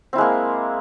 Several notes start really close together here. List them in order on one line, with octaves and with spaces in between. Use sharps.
C4 E4 G#3 A#3